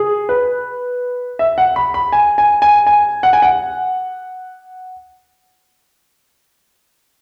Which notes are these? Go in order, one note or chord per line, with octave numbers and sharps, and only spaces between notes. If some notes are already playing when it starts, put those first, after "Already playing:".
Already playing: G#4
B4
E5
F#5
B5
B5
G#5
G#5
G#5
G#5
F#5
G#5
F#5